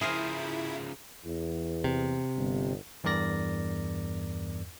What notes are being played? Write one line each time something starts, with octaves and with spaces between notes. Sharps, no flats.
C#3 F3 E4 G#4 A#4 C5
E2
C3
G1
E2 G2 A#4 D5 A#6